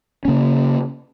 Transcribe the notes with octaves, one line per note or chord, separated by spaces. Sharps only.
C#3 A#3 C#4